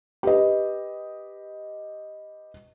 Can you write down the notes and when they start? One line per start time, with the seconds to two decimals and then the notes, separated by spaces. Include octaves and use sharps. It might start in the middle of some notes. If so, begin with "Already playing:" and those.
0.23 G4 B4 D#5